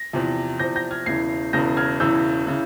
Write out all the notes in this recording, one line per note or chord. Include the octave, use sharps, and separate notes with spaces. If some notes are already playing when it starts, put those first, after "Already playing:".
Already playing: A#6
E2 C3 F3
E2 C3 F3 G6 A#6
G6 A#6
F6 G#6
E1 E2 C#3 E3 G#6 C7
E1 E2 C#3 E3 G6 A#6
F6 G#6
E1 E2 C#3 E3 E6 G6
C#3 E3